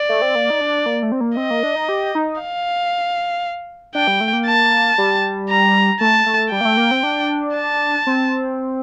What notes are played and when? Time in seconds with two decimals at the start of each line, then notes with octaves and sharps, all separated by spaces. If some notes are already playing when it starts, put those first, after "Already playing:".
Already playing: D5
0.09 A3
0.22 C4
0.35 A#3
0.50 D#4
0.61 D4
0.86 A#3
1.03 A3
1.12 C4
1.21 A#3
1.37 C4 D#5
1.51 A#3
1.63 D4
1.76 D#4
1.89 G4
2.15 D#4
2.41 F5
3.95 D4 G5
4.07 G3
4.21 A3
4.33 A#3
4.46 A5
4.98 G3
5.49 A#5
6.01 A3 A5
6.26 A3
6.52 G3 G5
6.61 A#3
6.65 A3
6.77 A#3
6.91 C4
7.03 D4
7.55 A5
8.07 C4